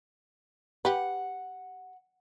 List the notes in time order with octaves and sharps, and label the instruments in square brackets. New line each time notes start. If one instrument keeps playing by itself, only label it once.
[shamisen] G4 B4 [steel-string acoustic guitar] F#5